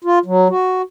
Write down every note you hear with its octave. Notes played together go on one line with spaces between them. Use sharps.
F4
F#3
F#4